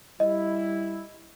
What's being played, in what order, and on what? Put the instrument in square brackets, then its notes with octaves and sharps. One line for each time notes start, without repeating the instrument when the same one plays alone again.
[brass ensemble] G3 E4 [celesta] D#5